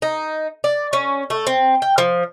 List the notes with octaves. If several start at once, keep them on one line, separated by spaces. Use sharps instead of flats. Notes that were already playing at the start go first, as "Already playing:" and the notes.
D#4
D5
C#4
A3
C4
G5
F3